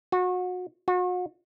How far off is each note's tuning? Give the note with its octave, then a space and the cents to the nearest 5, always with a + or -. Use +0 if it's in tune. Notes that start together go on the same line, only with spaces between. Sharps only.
F#4 -30
F#4 -40